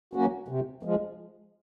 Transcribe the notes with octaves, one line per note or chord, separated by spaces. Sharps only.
F#3 A#3 C#4 F#4
C3
F3 G#3